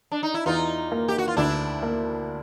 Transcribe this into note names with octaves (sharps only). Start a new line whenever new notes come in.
D4
D#4
E4
E2 D#4 F4
A#3
G4
F#4
F4
D2 D4 E4
A#3